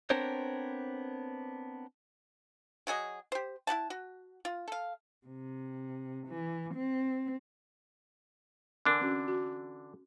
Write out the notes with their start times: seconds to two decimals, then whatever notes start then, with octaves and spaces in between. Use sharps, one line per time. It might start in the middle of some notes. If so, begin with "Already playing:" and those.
0.10 B3 C4 D4 A#4 C5 C#5
2.87 F#3 F#4 G#4 D#5
3.32 G4 C5
3.67 E4 G4 F#5 A5
3.90 F#4
4.45 F4
4.68 A4 F5
5.27 C3
6.28 E3
6.74 C4
8.85 D3 E3 C4 D4 A#4 G#5
9.01 C4 C#4 F#4
9.28 F#4